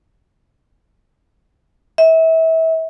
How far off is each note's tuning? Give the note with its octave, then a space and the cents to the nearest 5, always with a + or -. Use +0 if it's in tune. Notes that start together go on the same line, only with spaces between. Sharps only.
E5 -30